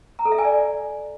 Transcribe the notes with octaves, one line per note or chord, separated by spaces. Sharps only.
A#5
A4
E5
G#5
D5